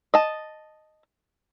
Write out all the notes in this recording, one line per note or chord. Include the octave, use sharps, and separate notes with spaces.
D#5 A5